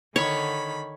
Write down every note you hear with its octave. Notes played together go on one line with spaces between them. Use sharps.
D3 D#3 C#5 B5